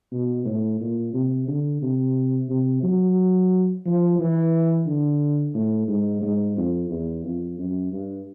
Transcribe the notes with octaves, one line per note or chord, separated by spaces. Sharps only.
B2
A2
A#2
C3
D3
C3
C3
F#3
F3
E3
D3
A2
G#2
G#2
F2
E2
F2
F#2
G2